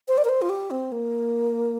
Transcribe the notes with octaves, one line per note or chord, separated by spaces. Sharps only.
C5
D5
A#4
C5
F4
G4
C4
A#3